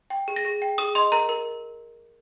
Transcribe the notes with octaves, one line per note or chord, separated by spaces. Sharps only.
G5
G#4
A#6
G#4
G5
G#4 D#6
D#5 C6
A#4 A#5
A#4